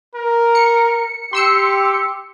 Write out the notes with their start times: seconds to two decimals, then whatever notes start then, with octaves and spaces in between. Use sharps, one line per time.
0.15 A#4
0.55 C#7
1.33 G4 C6 E6 C#7